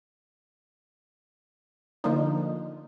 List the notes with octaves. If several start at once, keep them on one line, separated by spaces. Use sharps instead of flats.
D3 F3 A#3 D4 D#4